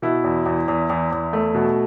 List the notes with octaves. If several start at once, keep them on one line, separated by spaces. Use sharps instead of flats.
B2 E4
E2
E2
E2
E2
E2
A3
B2